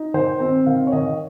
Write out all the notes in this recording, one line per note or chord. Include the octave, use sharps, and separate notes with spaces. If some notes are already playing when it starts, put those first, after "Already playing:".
Already playing: D#4
D#3 C5
C4
D#3 F5
C#5
D#3 D#5